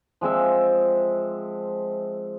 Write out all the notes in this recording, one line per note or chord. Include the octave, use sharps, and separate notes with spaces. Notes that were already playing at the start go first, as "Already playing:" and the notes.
F3 G#3 C4 E5